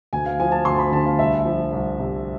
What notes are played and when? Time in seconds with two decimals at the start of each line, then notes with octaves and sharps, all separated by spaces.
0.13 D2 G#5
0.26 F5
0.40 F3 G#5
0.52 A5
0.65 D2 C6
0.79 B5
0.92 D3 A5
1.06 F5
1.19 C2 E5
1.45 F3
1.73 C2
1.99 C3